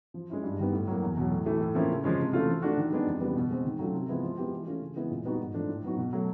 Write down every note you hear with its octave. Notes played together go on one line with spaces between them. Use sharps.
F3
G#3 C#4 E4
G2
D#3 G3 B3
A2
F#3 A#3
E2
B2 F#3
A2
E3 A3
A2
F3 A#3 C#4 E4
C#3
F3 G#3 C#4
C3
E3 A3 C#4 F4
F3
A3 D4 F#4
D#3
G#3 B3 D4
F2
C#3 E3 G3 B3
B2
G#3 C4
D#3
F#3 A3 C#4 F4
C3
F3 G#3 B3 E4
F3
G#3 B3 E4 G4
E3
A3 C#4 F4
C#3
E3 G#3 B3 E4
A#2
G3 B3 D#4 F#4
G#2
F3 A3 D4
A2
F#3 B3 D#4 F#4
B2
F#3 A3